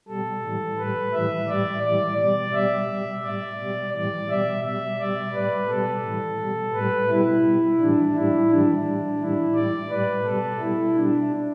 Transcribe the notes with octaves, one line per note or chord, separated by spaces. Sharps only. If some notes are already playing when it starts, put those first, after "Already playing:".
B2 G3 A4
A2 E3 G3
A2 G3 B4
A2 E3 G3 E5
A2 G3 D5
A2 E3 G3 D5
B2 G3 D5
B2 G3 E5
B2 G3
A2 G3 D5
B2 G3
A2 E3 G3 D5
B2 G3 E5
B2 G3 E5
B2 G3 D5
A2 G3 B4
B2 G3 A4
A2 E3 G3
B2 G3
A2 G3 B4
B2 G3 E4
B2 G3
A2 E3 G3 D4
A2 G3 E4
A2 E3 G3 D4
A2 G3
A2 E3 G3 E4
A2 G3 D5
A2 G3 B4
B2 G3 A4
B2 G3 E4
B2 G3 D4